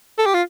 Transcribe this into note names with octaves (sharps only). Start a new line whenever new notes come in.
A4
G4
F4